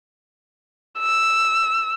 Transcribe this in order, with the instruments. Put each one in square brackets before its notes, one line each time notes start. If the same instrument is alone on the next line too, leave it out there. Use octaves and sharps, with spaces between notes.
[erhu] E6